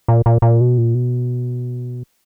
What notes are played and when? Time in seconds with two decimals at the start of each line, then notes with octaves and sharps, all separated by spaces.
0.08 A#2
0.26 A#2
0.42 A#2
0.61 B2
0.78 A#2
0.95 B2